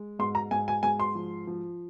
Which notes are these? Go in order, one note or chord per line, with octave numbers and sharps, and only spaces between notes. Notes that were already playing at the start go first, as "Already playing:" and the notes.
Already playing: G#3
G#2 C6
A#5
G#2 G#5
G#5
G#2 G#5
C6
F3
F3